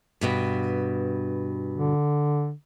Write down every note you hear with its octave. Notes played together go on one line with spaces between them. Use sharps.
G2 B2 B3
D3